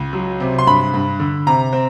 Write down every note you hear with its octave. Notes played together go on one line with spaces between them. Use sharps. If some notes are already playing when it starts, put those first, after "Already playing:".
Already playing: C#2
F#3
C3
C6
G2 B5
G2
D3
C3 A#5
C4